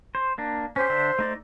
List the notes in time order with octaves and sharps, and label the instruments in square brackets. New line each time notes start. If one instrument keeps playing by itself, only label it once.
[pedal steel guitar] C5
A#3 D4
[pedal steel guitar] C#4 G4 [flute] C5
[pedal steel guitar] D3 D4 E5
A3 D#4 D5